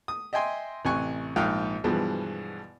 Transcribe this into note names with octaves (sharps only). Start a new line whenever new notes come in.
D#6
D#5 E5 G5 G#5 C6
A1 C3 G#5 C#6 F#6
A#1 G#2 F5 G5 F#6
G2 B2 E3 F3 G#3